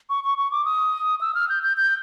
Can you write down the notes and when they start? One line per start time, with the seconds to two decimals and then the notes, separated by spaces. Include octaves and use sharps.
0.10 C#6
0.24 C#6
0.38 C#6
0.52 D6
0.65 D#6
1.21 E6
1.35 F6
1.49 G6
1.63 G6
1.77 G6